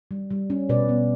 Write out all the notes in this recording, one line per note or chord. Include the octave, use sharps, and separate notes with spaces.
G3
G3
C#4
B2 B4 D5
B3